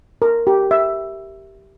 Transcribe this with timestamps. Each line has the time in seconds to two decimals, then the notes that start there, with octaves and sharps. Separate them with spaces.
0.22 A#4
0.47 G4
0.71 E5